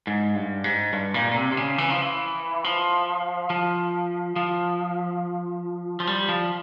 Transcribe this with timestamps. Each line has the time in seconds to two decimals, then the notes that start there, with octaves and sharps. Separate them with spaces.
0.07 G#2
0.35 G2
0.64 G#2
0.93 G2
1.14 A#2
1.31 A#2
1.36 C3
1.52 C3
1.57 C#3
1.78 E3
1.89 F3
2.01 E3
2.64 F3
3.50 F3
4.36 F3
6.00 F3
6.07 G3
6.29 F3